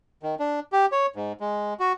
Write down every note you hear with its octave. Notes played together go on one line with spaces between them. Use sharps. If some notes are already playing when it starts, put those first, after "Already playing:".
D#3
D4
G4
C#5
G#2
G#3
F#4